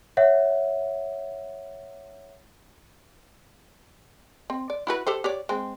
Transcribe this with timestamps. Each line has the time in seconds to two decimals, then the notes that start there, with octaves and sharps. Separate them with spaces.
0.17 C#5 E5 F#5
4.50 C4
4.70 D5
4.87 E4 F#4 B4
5.07 G4 A4 C5
5.24 G4 C#5 D5
5.49 G#3 C4